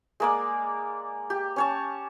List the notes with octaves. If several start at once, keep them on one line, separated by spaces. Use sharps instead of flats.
G#3 A#3 D5
G4
C#4 C#5 A5